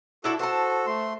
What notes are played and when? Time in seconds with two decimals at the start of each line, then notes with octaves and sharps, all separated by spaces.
0.24 D4 E4 F#4 A4 A5
0.39 F#4 A4 C5 A5
0.87 A3 C6